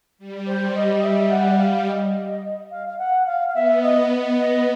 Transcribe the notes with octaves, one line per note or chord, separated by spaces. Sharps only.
G3
C5
D#5
E5
F#5
F5
D#5
F5
F5
F#5
F5
F5
B3 E5
D#5
B3 D#5